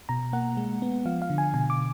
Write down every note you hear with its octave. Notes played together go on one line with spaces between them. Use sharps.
B2 A#5
A#3 F#5
G#3
B3
F3 F5
F5
D3
G#5
B2 G#5
D6